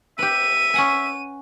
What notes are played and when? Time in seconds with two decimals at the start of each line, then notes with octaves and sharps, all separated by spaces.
0.19 G4 B4 E5 D#7
0.74 C#4 F#5 G#5